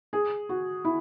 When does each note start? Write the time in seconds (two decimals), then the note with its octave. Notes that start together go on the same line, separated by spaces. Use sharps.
0.13 G#4
0.49 F#4
0.85 E4